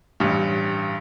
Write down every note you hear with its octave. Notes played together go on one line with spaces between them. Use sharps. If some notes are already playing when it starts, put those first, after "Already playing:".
A1 G2